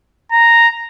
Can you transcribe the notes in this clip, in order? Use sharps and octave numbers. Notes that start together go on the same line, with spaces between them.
A#5